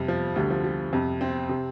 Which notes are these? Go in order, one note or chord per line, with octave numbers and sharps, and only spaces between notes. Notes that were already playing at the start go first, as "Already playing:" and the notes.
Already playing: F2 C3 G3
F3
D2 D3 G3
F3
G3
F2 C3
C4
C3